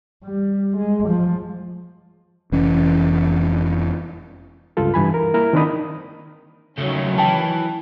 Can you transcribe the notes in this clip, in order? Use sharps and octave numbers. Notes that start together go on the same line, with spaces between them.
G3
G#3
F3
F1 E3 C#4
C#2 G2 F4 A4
G2 E3 G#5 B5
A#4
A#3 E4 A#4
D#3 C4 D4 D#4 B5 D#6
C#2 D#3 F#3 A3 C#4
E3 G5 A5